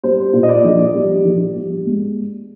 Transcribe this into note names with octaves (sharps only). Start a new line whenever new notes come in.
G3 C5
A#2
D#5
D5
A#1
G3
A#1
G3
G#3